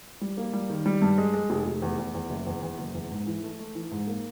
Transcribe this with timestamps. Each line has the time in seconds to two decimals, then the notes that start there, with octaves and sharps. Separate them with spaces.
0.21 G3
0.37 A#3
0.53 G3
0.70 D#3
0.86 G3
1.02 G2
1.18 G#3
1.34 G#3
1.50 F1
1.66 F1
1.82 E2
1.98 E2
2.14 E2
2.30 F#1
2.47 E2
2.63 E2
2.79 F#1
2.94 E2
3.10 G#2
3.27 E3
3.43 A3
3.59 A3
3.75 E3
3.91 G#2
4.07 A#3